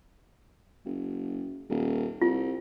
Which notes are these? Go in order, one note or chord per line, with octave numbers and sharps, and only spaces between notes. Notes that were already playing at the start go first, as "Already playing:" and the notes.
F#1
D#1
C2 F4